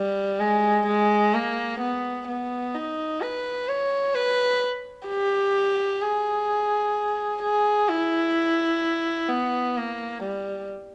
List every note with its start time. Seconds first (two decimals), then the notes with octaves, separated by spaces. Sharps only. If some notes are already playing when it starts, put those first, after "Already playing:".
Already playing: G3
0.40 G#3
0.87 G#3
1.34 A#3
1.80 B3
2.27 B3
2.75 D#4
3.21 B4
3.68 C#5
4.15 B4
5.08 G4
6.02 G#4
7.43 G#4
7.89 E4
9.29 B3
9.77 A#3
10.23 G3